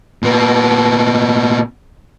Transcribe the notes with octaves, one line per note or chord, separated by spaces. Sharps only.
A#2 B3